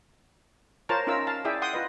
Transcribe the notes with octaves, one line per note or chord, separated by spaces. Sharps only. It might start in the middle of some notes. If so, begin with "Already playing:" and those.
F4 A#4 C5 C#5 A5 A#5
C#4 D#4 F4 A#4 E5 E6
F5 A5
E4 G#4 D5 E5 G5
F#5 G5 C6 D#6
F4 B4 D#5